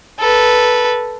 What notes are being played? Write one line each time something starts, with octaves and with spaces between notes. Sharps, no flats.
A4 B4